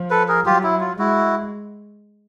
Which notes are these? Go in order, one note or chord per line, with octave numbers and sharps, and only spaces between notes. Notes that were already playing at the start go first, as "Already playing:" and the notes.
Already playing: F3
A4 B4
G#4 A#4
F#3 F4 G4
E4
F4
G#3 E4 F#4